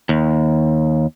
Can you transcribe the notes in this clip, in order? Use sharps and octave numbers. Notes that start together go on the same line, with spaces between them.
D#2